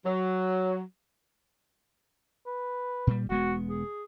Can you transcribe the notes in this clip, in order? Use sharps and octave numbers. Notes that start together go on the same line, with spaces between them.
F#3
B4
A#2 G3
E1 G#3 B3 F#4
G#4